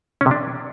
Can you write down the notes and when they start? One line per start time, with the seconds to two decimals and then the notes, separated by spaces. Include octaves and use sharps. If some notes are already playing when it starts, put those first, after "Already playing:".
0.21 C#4
0.26 C3
0.31 D4